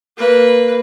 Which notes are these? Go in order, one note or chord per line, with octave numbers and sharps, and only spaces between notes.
A#3 B4